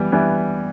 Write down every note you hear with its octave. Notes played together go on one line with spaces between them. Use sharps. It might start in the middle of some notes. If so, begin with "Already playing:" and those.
Already playing: E3 G3 B3
E3 G3 B3 E4